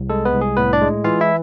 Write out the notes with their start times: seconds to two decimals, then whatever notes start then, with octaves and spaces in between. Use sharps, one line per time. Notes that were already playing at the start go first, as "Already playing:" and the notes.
Already playing: C2
0.10 G#3 A4
0.25 B3 B4
0.34 C2
0.41 G#4
0.57 A2 B3 B4
0.73 D4 D5
0.82 G#3
1.04 E3 F4 F5
1.21 E4 E5